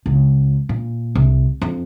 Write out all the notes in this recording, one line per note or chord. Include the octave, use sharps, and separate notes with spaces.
C#2
A#2
C2
F2